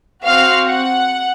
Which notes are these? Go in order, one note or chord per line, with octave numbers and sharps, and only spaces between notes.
C4 F#4 F5
F#5